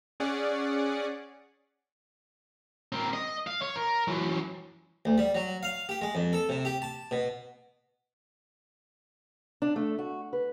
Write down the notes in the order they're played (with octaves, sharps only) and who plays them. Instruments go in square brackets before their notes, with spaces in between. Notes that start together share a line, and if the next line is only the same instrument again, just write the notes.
[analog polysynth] C#4 G#4 D5 F#5
[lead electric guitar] C4 A#4
D#5
F5
C#5
A#4
E3 F#3
[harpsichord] D2
G3
F#3
F5
G4
G#3
F2
A4
C3
G4
A5
B2
[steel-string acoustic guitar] D4
A3
F#4
B4